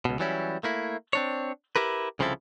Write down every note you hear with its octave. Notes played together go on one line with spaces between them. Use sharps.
C#2 B2
E3 F#3 G3 C#4 E4
A3 A#3 E4
C4 D4 C#5
E4 G4 A#4 B4
C2 C#3 F3 C4 E4 A4